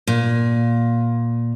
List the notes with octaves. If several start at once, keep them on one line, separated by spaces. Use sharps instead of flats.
A#2